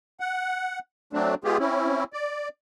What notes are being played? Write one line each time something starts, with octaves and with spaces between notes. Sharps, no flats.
F#5
F#3 A3 C4 D4
G#3 B3 F4 G4 G#4
C4 C#4 E4
D5